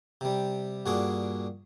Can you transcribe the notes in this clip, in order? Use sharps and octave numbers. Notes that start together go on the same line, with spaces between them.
C3 G3
G2 A#2 D4 F#4 G#4 D6